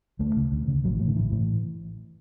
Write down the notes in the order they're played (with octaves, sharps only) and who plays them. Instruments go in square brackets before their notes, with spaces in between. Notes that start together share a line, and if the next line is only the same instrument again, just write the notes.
[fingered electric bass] D2 A3
C#3
D2
C#3
A1 F#3
E3
A2
D3
A1 E3
A2